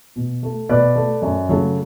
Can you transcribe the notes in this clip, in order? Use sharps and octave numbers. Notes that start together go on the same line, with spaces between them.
B2
A3
B2 B4 D5
A3
F#2
C#3 F#3 A3